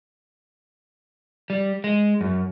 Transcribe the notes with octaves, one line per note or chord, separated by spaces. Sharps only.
G3
G#3
F#2